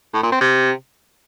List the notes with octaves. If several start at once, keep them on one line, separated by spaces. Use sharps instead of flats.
A2
A#2
C4
C3